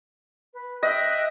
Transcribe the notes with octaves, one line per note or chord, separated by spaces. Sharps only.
B4
D#5 E5 G5 F#6